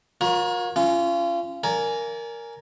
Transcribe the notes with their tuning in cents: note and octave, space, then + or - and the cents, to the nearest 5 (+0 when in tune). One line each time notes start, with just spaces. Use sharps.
F4 +45 A#4 +20 C#5 +0
C#4 +0 F4 -30
A#4 -5 D5 -35 G#5 +5